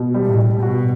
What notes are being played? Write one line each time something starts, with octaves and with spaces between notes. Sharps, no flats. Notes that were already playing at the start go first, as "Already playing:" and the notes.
Already playing: B2
G3
A2
G3
B2 F#4